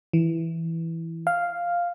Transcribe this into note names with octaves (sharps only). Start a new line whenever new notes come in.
E3
F5